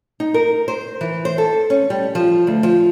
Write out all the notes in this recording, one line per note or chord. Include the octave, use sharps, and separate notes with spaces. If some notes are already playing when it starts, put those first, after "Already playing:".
D#4
A#4
C5
E3
C5
A4
C#4
G3
F3
D2
F3